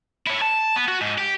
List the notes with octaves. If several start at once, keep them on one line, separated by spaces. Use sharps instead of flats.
E4 C#5
A5
B3
F#4
G#2
G4